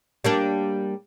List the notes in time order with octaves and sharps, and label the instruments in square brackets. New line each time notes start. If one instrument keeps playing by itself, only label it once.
[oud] G3 A#3 D4